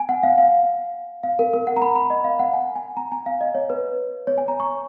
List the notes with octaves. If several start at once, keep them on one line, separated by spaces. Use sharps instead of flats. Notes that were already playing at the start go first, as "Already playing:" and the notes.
Already playing: G#5
F#5
F5
F5
F5
A#4
A#4
F#5
A#5
B5
B5
D#5
F5
F#5
G#5
G#5
A#5
G#5
F5
D#5
C#5
B4
C#5
G#5
A#5
C#6